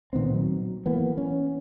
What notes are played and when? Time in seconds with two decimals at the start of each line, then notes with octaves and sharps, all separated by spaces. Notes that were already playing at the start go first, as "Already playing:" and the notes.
0.13 A#2 D#3 B3 C4
0.34 F#3
0.86 E3 A#3 B3
1.18 C#4